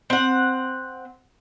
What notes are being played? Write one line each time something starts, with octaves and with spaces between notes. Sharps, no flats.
C4 F#5